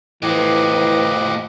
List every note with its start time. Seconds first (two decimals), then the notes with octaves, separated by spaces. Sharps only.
0.22 A2 E3 F3 G4 D#5 F#6